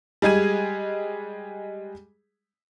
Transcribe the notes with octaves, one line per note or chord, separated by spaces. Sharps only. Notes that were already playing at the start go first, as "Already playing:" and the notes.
G3 G#3 G#4 G#6 D#7